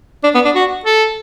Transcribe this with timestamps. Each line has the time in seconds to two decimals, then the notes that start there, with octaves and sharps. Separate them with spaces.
0.24 D4
0.35 B3
0.45 D4
0.55 F#4
0.85 A4